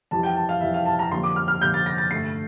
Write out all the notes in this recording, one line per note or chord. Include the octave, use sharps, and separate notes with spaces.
F2 E3 G3 A5
G5
A5
F5
F2 E3 G3 E5
F5
A5
A#5
F2 D3 G3 A#3 C6
D6
F6
F6
F2 D3 G3 A#3 G6
A6
A#6
A6
G2 D3 A3 C7